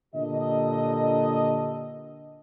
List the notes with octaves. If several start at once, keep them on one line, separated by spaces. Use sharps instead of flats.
A#2 D3 G4 A4 D#5